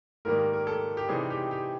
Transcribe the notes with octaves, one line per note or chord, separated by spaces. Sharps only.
G#2 D#3 G3 A#3 A#4
A#4
A#4
A4
G4
C3 E3 G3 C4 D#4 G#4
G4
G4